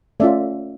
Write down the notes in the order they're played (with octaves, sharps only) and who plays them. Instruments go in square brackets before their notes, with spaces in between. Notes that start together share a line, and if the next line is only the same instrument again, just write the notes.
[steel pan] A3 C#4 F4 D5 E5